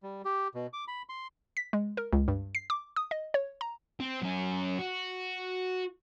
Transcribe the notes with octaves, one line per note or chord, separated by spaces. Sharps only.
G3
G4
B2
D6
B5
C6
B6
G#3
A#4
C#2
G2
C7
D6
D#6
D#5
C#5
A#5
C4
F#3 C#4
F#4